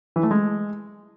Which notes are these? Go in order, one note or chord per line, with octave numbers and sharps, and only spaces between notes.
E3
A3
G#3